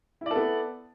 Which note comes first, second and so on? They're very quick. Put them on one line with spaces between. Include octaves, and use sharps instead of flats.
E4 D5 A4 B3